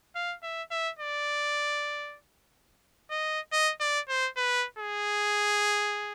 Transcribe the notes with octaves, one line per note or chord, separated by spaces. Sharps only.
F5
E5
E5
D5
D#5
D#5
D5
C5
B4
G#4